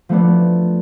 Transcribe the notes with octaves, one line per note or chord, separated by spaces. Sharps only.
F3 A3 B3 D4